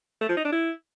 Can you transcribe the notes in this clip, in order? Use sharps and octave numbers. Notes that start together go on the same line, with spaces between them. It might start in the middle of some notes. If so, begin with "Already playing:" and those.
A3
F3
D#4
D4
E4